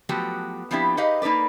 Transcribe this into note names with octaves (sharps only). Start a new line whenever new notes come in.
F3 F#3 A3 B3 F#4 G4
F3 B3 C4 D4 E4 G4
D#4 G4 G#4 B4 D#5 F5
A#3 D#4 A4 B4 D5